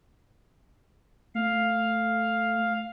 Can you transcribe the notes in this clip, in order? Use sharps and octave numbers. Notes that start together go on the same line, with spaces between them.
A3 F5